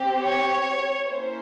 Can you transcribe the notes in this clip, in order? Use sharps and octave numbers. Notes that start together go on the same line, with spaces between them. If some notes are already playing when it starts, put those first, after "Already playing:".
Already playing: C4 G4
C#5
A#3 C#4 E4 C5